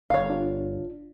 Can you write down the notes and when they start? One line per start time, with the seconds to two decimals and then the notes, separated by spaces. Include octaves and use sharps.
0.10 G1 C#5 F5
0.30 D4 F4